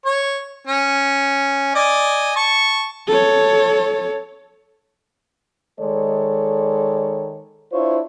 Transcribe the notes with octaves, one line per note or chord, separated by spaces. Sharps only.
C#5
C#4
D5 D#5 G#5
A5 C#6
A4 C#5
D#3 G#3 A4 C#5 D5
D4 E4 F4 C5 C#5